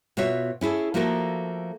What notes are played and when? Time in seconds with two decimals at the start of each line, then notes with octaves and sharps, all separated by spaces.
0.17 B2 F4 F#4 C#5 E5
0.61 C#4 E4 G#4 A4
0.94 F3 A3 A#3 F#4 A4 A#4